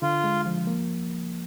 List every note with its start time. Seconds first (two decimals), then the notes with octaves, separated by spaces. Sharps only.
0.02 D3 F4
0.24 G#3
0.46 F3
0.67 A#3